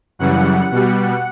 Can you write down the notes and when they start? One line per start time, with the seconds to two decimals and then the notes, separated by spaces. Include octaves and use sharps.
0.19 F#2 C#3 E3 G3 F#5
0.71 B2 G3